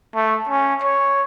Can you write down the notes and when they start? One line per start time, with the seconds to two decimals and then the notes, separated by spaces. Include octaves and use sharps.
0.15 A3
0.49 C#4
0.83 C#5